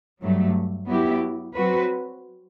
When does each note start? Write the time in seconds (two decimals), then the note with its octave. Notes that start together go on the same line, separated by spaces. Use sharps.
0.21 G2 F#3 A3
0.88 F#3 B3 E4 G4
1.55 F#3 C4 F#4 B4